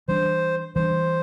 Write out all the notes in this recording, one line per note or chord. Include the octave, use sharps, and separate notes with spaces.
E3 G3 D4 C5
E3 G3 D4 C5